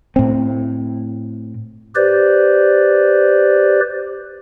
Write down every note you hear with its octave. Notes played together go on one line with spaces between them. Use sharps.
A2 C4
G4 B4 C5 D5